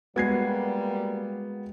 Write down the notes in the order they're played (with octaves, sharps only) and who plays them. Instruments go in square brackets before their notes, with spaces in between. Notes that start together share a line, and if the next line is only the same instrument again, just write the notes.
[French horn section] G3 A#3 [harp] G#3 F#4 [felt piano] B3 G#6 C7